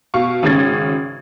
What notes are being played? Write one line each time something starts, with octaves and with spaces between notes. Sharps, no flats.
B2 F5 C#6
G#1 C#3 G#3 C#4 G#6 A6